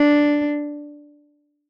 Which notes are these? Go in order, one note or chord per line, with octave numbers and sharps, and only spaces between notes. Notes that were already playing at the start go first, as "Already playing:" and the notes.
Already playing: D4